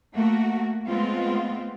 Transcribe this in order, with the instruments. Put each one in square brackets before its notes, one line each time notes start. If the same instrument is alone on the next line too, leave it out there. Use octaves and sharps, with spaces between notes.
[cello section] A3 A#3 F#4
G#3 A3 B3 C4 F4